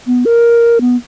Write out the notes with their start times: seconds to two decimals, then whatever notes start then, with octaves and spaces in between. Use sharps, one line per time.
0.07 B3
0.25 A#4
0.81 B3